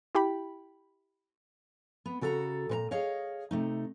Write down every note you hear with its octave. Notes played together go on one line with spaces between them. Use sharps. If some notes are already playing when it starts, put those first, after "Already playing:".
E4 G4 G5 B5
B3
C#3 F#4 A4 E5 A#5
A#2 B4 A#5
G#4 C#5 D#5 F5
C3 A3 D#4